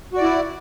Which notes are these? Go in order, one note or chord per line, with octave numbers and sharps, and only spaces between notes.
E4 F#4 D5